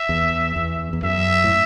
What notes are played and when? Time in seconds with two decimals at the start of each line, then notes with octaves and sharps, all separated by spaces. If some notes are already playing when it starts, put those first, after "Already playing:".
Already playing: E5
0.09 E2
0.56 E2
0.93 E2
1.03 F#2 E5
1.44 A2